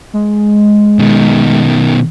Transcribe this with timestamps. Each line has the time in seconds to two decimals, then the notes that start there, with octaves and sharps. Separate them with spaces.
0.14 G#3
0.99 B2 D#3